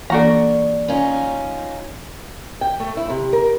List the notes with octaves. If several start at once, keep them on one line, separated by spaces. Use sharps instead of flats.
E3 A#3 D4 F#4 A4 A#5
C#4 D#4 F4
G5
A3
E4
C3
A#4